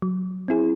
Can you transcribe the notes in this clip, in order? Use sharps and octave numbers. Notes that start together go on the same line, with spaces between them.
F#3
C4 E4 G#4